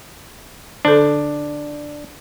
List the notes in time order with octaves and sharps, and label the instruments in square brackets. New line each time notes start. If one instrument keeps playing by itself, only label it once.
[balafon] D3 A4 [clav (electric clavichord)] D4